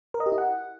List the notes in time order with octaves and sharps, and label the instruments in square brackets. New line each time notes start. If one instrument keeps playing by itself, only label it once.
[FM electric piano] A#4
D#5
G4
E4
F#5